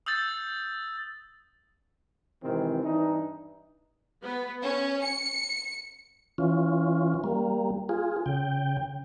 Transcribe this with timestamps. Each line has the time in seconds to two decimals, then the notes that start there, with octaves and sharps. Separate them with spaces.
0.06 D#6 E6 G6 A6
2.43 G#2 C3 D#3 E3 C4
2.83 G2 E3 D4 D#4
4.23 B3
4.62 C#4
5.03 C#7
6.38 E3 C#4 F4
7.24 G3 A#3
7.89 F4 G#4
8.26 C#3 G5